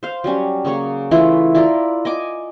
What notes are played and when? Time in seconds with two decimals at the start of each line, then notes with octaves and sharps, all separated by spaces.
0.03 C5 F5
0.24 F#3 G3 C#4
0.65 C#3 A#3 C#5
1.11 E3 A3 E4 F4
1.55 E4 F4 A#4 D5
2.05 D#5 G#5 D6